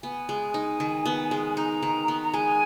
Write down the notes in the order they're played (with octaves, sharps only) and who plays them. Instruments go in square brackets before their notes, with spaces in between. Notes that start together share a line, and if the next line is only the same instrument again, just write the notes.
[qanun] B3 [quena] G#5
[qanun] G#3
D#4
D#3
B3
G#3
[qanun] D#4 [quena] A#5
[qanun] D#3
B3
[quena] A#5
[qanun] G#3 [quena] G#5